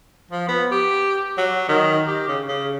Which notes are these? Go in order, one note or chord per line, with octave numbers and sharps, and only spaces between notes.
F3
B3
G4
F#3
D#3
G4
C#3
C#3